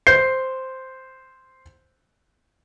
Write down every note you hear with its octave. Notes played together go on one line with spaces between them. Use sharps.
C5 G6 C7